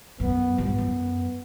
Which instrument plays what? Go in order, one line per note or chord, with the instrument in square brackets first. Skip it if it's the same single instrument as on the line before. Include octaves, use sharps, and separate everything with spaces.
[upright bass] F#2 [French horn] B3
[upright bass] G2 [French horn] B3
[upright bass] F#2